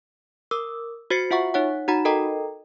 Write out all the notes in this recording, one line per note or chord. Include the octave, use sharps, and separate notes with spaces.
A#4 D6 E6
F#4 C5 A6 C7 C#7
F4 E5 F#5 C#6
D#4 C#5 F#5
D#4 F#4 F#5 A#5 B5
A4 A#4 D#5 G5 A#5